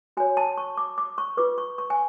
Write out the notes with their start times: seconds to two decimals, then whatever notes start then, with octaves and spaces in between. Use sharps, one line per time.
0.17 F#4 C#5 G#5
0.37 A5
0.57 C#6
0.77 D6
0.98 D6
1.18 C#6
1.37 F4 B4 D6
1.58 C#6
1.78 C#6
1.90 G#5